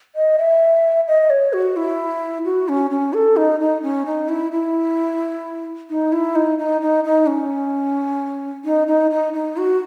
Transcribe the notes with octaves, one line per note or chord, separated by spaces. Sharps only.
D#5
E5
D#5
C#5
F#4
E4
F#4
C#4
C#4
A4
D#4
D#4
C#4
D#4
E4
E4
D#4
E4
D#4
D#4
D#4
D#4
C#4
D#4
D#4
D#4
D#4
F#4